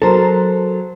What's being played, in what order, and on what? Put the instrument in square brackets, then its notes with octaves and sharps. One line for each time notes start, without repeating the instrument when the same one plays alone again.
[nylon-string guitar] F#3 C5 [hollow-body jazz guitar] A4 A#4